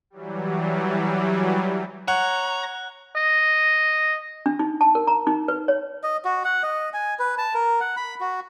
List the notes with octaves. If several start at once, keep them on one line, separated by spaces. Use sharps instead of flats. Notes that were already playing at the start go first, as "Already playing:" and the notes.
E3 F#3 G3
C#5 F#5 A#5 F#6
D#5
D4
D#4
A5
A#4
A#5
D#4
B4
C#5
D#5
F#4
F#5
D#5
G#5
B4
A5
A#4
F#5
B5
F#4